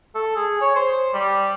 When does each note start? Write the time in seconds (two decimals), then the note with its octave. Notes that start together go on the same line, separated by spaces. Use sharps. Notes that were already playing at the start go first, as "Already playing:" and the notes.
0.15 A4
0.36 G#4
0.62 C#5
0.76 C5
1.14 G3